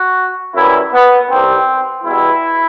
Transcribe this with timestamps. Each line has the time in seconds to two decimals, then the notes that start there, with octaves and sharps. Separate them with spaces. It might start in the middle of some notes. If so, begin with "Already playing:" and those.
Already playing: F#4
0.55 F#2 E3 G3 E4
0.93 B3
1.29 C2 C3 D#3 G3 C4
2.04 E2 B2 G3 E4